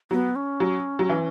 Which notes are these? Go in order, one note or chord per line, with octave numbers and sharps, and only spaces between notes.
F#3 B3
C#4
F#3
F#3
E3